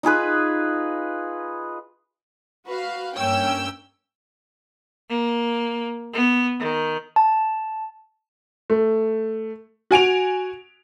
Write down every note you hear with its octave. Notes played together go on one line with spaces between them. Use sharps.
D#4 F4 G#4 B4
F#4 B4 F5
G2 A#3 C#4 C#5 G5 E6
A#3
B3
D#3
A5
A3
F#4 G#5 D7 F7